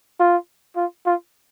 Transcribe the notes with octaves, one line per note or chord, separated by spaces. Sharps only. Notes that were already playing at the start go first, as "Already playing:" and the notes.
F4
F4
F4